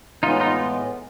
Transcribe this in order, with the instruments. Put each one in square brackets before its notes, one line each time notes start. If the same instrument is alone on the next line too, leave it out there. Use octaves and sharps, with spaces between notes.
[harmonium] A2 E3 G#3 B3 [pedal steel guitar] D#4 F4
[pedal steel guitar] D#4 F4